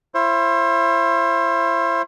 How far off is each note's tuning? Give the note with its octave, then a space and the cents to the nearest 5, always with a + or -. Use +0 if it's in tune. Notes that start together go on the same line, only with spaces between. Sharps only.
E4 +35 C5 +35